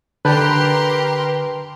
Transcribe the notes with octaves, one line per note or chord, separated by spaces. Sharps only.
D3 G4 A#4 B4 A5 C6 G6